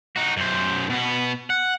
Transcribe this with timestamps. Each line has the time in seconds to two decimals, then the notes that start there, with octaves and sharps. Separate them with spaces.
0.16 D#4 F#4
0.37 F#2 C5
0.89 B2 B3
1.50 F#5